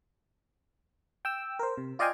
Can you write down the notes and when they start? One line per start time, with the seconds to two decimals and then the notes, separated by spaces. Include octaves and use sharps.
1.25 G5 E6
1.59 A#4 C5
1.78 C3
1.99 F4 D5 D#5 F5 G5 G#5